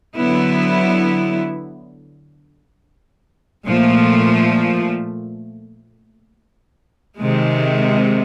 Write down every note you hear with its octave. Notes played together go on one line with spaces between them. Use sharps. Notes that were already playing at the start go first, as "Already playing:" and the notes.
D3 F#3 B3 E4
A#2 F3 A3
C3 D#3 G#3